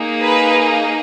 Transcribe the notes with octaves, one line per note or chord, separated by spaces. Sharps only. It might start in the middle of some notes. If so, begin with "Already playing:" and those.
Already playing: A#3 D#4 G#4
B4